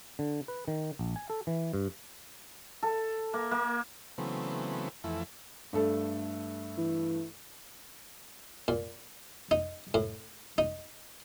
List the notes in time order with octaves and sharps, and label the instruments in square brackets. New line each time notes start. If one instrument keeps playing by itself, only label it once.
[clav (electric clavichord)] D3
B4
D#3
A#1
G#5
A4
E3
G2
[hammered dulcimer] A4
A#3
A#3
[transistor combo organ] C#3 E3 F#3 A3 B3 C4
F2 E3 A3 E4
[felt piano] G2 A3 A4
[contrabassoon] E3
[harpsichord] A#2
D#4
A2
D#4